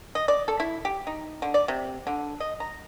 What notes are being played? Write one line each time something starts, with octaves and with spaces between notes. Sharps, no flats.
D#5
D5
A4
E4
G4
D#4
D3
D5
C3
D3
D#5
A#5